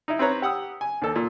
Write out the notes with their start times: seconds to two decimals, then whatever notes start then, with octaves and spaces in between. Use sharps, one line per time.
0.08 D#4 E4
0.19 C4 B4 C#5 A#5
0.42 G4 F#5 D#6 E6
0.81 G#5
1.02 D#2 A4
1.15 A#2